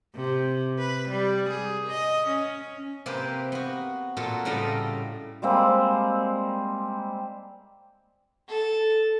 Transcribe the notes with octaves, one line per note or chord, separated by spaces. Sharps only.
C3
B4
G3
G#4
D#5
C#4
C3 A#3 G4 B4 C5
B3 F#4
A#2 F4 F#4 A4
A2 C#3 G3 A4 D#5 A#5
G3 G#3 A#3 C4
A4